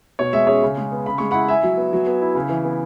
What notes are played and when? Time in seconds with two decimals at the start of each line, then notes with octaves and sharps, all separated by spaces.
0.19 B2 C#5
0.33 G#3 E5
0.47 C#4 G#4 C#5
0.63 C#3
0.77 G#3
0.92 B3
1.06 C#3 B5
1.18 G#3 C#6
1.31 E4 F#5 B5
1.48 E4 E5 G#5
1.63 F#3
1.77 B3
1.93 F#3
2.07 B3
2.21 E4
2.35 C#3
2.49 E3
2.65 B3